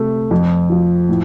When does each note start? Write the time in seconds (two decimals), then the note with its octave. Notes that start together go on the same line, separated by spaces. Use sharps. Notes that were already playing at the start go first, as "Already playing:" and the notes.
Already playing: C3 A3
0.31 F2
0.70 F3
1.09 A2